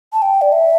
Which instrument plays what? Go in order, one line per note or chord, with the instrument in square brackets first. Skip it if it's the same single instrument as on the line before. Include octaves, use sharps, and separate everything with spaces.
[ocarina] A5
G5
D5
E5